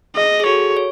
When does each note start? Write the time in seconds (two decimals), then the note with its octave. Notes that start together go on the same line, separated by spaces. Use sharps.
0.16 G#4 D#5
0.40 G#4
0.46 F#4 A4 C#5
0.77 C#5